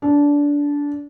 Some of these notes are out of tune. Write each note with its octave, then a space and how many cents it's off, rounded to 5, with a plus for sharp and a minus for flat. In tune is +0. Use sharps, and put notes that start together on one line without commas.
D4 -20